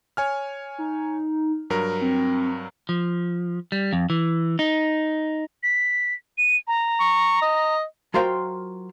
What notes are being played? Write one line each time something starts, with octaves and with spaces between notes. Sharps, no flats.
C#5 G#5 F6
D#4
G2 F#3 A#4
C4
F3
G3
F2
E3
D#4
B6
D#7
A#5
C#6
D#5
F#3 F4 A#4 C5 F5 G5